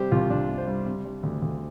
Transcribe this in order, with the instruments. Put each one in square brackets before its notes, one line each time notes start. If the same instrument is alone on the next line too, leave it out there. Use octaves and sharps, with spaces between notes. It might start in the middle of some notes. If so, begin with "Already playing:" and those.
Already playing: [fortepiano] C3 G3 G4 C5
C2 F4
C2 D4
C3
C5
G3
C3
G3
D2
D2